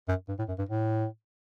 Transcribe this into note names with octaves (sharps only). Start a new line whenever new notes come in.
F#2
G2
A2
F#2
G2
A2